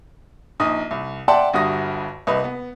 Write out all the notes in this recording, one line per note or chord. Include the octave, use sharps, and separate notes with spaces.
A#1 D#4 D#6
C2
D5 E5 F#5 G5 A5 C6
G1 G2 F#4 E5 D#6 A#6
C2 B4 D#5
B3